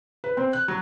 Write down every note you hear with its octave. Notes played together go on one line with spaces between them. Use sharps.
B4
C4
F#6
F#3